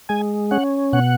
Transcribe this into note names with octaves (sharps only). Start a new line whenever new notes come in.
G#3 G#5
C#4 F#5
B2 F#5